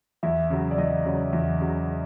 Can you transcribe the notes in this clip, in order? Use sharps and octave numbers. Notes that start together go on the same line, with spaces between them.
E2 E4 E5
C#3 F#3
D5
E2 D#5
C#3 F#3
E2
C#3 F#3